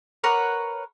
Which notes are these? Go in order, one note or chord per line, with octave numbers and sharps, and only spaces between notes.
A#4 B4 C#5 F#5